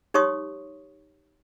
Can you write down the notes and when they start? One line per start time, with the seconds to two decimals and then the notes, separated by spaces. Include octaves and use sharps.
0.14 D#4 G4 C#5 C6 C#6 D#6